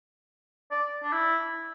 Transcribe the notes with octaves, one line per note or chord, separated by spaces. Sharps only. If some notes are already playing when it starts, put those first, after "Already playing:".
D5
D4
E4